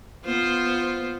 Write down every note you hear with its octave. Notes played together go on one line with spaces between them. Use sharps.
B3 F4 C5